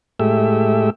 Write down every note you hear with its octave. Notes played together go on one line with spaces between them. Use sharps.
A2 G#3 A3 G4 E5